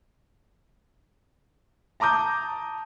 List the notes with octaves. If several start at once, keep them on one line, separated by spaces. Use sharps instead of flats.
A5 A#5 D6 D#6 G6